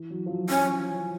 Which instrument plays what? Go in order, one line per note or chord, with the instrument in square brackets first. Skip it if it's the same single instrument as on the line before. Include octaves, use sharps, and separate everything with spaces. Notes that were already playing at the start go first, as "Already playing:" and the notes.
Already playing: [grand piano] E3
F#3
F3
F#3
[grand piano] F3 [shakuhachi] C#4